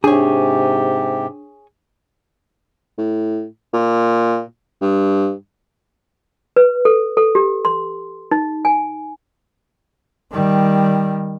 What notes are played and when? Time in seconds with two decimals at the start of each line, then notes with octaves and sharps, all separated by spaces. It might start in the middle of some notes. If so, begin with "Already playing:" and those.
0.04 G#2 C3 D4 G4 G#4 C#5
2.98 A2
3.73 A#2
4.81 G2
6.56 B4
6.85 A4
7.17 A4
7.35 G4
7.65 C6
8.31 D#4
8.65 G#5
10.32 D#3 G3